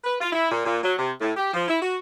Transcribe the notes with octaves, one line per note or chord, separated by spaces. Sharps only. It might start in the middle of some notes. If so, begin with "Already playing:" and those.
B4
F4
E4
A#2
A#2
F#3
C3
A2
G4
F3
E4
F#4